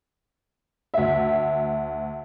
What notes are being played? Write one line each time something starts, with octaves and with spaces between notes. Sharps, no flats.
D2 E5